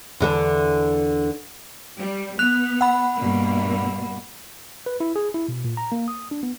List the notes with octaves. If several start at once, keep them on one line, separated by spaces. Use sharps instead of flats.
E2 D3 A4
G3
B3 F#6 F7
F#5 B5
G2 B2 A#3
B4
E4
G#4
E4
B2
A#2
A#5
A#3
D#6
D4
B3